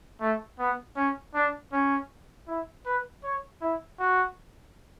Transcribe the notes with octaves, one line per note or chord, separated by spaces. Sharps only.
A3
B3
C#4
D4
C#4
E4
B4
C#5
E4
F#4